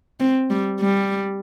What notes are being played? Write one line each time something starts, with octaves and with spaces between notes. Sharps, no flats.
C4
G3
G3